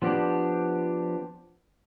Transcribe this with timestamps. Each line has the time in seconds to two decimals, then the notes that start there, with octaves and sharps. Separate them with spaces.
0.02 F3 B3 D4 G4